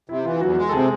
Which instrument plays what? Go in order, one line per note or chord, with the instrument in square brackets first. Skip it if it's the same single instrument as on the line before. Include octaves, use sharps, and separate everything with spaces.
[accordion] C3 [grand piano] E4
[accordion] E3 [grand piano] F4
[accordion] E2 [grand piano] F#3 F#4
[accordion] G#3
[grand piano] A4
[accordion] C3 [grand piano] G#3 G#4